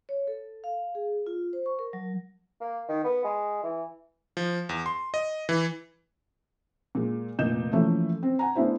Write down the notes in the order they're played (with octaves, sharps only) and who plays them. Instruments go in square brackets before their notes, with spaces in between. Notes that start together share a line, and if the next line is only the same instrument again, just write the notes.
[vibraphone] C#5
A4
F5
G#4
F4
C5
C#6
A#4
F#3
[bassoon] A#3
D#3
B3
G#3
E3
[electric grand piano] F3
E2
C6
D#5
E3
[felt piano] A#2 G#3
F1 A#2 D#5 G6 E7
E3 F3 A3 A#3 C#4
C4
F#5 G#5 A#5
A3 B3 D4 E4 C5